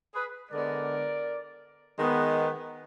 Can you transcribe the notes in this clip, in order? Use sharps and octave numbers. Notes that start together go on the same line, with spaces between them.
G#4 B4
D3 G#3 B3 A#4 D5
D#3 G#3 B3